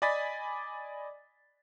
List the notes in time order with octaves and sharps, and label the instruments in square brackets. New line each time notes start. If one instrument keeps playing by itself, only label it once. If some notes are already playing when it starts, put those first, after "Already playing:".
[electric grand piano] D5 D#5 G#5 B5 A6 B6